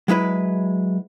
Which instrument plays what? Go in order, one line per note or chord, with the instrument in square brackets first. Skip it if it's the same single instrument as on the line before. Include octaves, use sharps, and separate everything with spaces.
[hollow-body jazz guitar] F#3 G#3 E4 B4